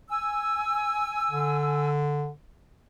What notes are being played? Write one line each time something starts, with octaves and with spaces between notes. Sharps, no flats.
G#5 E6
D3